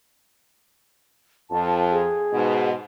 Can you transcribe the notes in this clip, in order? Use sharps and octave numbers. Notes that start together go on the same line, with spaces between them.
F2 A5
G#4
G#2 B2